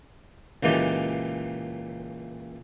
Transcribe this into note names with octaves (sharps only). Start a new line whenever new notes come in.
C#2 A#2 E3 D#4 G4 A5